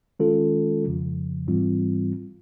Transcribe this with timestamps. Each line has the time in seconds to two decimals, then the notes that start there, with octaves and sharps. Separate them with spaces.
0.20 D#3 G#3 C#4 F4 A4
0.84 F2 C#3 F3
1.47 G#2 E3 G3 C4 F4